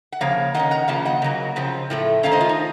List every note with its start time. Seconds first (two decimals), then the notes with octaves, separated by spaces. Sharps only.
0.12 F#5
0.21 C#3 F3 A#3 C#5 F5
0.54 D#3 A#3 D#5 F#5
0.59 C#4
0.71 F#5 A#5
0.88 C#3 F3 A#3 F5 A5
1.05 D#5 F#5
1.22 C#3 F#3 A#3
1.56 C#3 F3 C4
1.90 A2 F3 A3
2.23 D#3 A3 C#4 C#5 F5
2.32 C5 D#5
2.41 F4
2.49 D#4